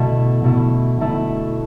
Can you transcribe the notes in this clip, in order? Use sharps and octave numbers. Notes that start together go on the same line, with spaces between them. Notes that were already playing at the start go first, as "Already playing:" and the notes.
Already playing: B2 A3 E4
B2 A3 E4
B2 A3 E4